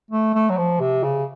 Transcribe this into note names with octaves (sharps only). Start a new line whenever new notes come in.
A3
A3
F#3
F3
C3
C#3